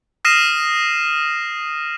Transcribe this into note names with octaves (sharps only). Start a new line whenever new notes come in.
D#6 F6 A#6 C7 D#7 E7